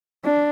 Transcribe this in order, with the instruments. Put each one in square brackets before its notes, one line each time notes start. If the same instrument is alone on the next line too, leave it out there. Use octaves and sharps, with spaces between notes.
[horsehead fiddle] D4